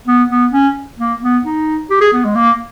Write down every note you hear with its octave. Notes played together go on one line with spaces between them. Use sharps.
B3
B3
C#4
A#3
B3
D#4
G4
G#4
B3
G#3
A#3